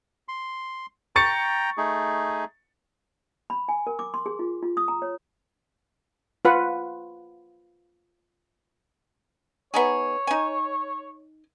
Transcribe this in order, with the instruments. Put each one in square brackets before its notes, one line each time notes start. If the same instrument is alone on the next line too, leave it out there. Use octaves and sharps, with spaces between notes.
[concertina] C6
[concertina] G5 A#5 [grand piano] C#6 A6 C#7
[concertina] A3 D#4 G#4
[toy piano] B5
G#5
A#4
D6
C6
G#4
F4
F4
D#6
A#5
C#5
[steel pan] F4 B4 F#5
[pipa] B3 D#4 G#4 [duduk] C#5
[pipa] D#4 G#5